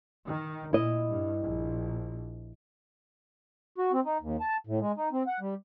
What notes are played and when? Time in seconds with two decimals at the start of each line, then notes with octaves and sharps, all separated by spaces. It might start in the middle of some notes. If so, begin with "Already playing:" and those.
0.25 D#3
0.73 A#2 E4 D#5
1.09 G2
1.40 A#1
3.78 F#4
3.93 C4
4.05 D#4
4.21 D#2
4.40 A5
4.67 A2
4.81 G#3
4.97 D#4
5.12 C4
5.27 F#5
5.40 G3